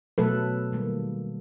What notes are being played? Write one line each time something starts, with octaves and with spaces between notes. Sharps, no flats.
B2 F#3 A3 A4 B4
D#3 G3 A#3